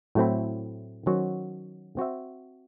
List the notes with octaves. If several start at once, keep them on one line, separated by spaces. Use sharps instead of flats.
A2 F#3 A3 C4 E4
D#3 F#3 C#4 F#4 C5
C4 F#4 C5 E5